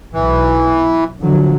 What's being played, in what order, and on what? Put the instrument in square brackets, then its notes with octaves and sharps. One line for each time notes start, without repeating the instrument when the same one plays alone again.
[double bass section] B1 [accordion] E3
[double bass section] D3 F3 F#3